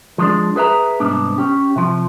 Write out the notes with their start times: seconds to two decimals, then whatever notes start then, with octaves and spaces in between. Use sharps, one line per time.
0.18 F3 G#3 D4
0.56 G#4 B4 E5 A#5
1.00 C2 G#2 B3 D4
1.38 C#4 G4
1.76 C3 F3